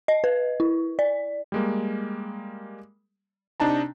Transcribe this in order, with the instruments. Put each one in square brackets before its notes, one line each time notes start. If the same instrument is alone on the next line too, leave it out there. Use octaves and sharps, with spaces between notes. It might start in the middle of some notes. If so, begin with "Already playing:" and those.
[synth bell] D#5
B4
E4
D5
[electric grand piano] G3 G#3 A#3
C3 D4 D#4 A5 A#5